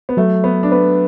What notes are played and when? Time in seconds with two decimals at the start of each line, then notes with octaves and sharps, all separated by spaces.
0.09 B3
0.17 F#3 A3
0.44 B3 B4
0.63 D4
0.72 B3 B4